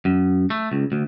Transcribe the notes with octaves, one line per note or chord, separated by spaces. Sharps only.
F#2
A3
C#2
D2